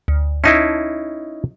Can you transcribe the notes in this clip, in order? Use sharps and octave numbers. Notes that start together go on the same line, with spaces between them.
D2
C#4 D#4 E4 E5 A5 C7